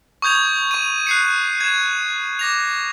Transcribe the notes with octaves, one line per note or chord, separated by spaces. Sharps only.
C#6 D#6 G6 G#6 F7
C#6 D#7
F#6 C7 C#7
G#6 E7
D6 A#6 F7